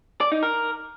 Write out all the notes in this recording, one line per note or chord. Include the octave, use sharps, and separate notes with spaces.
D5
D#4
A#4